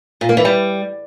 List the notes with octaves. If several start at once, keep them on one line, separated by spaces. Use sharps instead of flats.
A#2
A#3
E3
G3